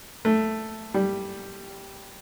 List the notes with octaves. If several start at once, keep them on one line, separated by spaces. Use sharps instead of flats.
A3
G3